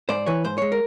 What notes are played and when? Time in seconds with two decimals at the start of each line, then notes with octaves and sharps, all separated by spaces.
0.09 G#2 C5 D5
0.26 E3 B4 C#5
0.44 G#2 C5
0.58 G#3 C#5
0.72 A#4